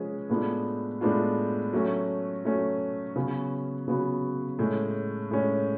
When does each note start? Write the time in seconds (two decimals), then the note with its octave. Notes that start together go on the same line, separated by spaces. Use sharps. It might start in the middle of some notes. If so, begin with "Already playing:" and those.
Already playing: F3 G#3 C#4 G#4 B4
0.30 A2 G#3 B3 D4 F4
1.01 A2 G#3 B3 D4 F4
1.73 F#3 A3 C#4 F#4
2.45 F#3 A3 C#4 F#4
3.16 C#3 F#3 B3 F#4
3.88 C#3 F#3 B3 F#4
4.59 A2 G#3 C#4
5.31 A2 G#3 C#4